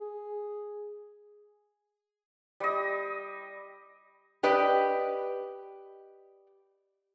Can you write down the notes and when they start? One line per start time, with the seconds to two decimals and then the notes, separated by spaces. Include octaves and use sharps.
0.01 G#4
2.60 G3 D#5
4.43 G4 B4 D5 D#5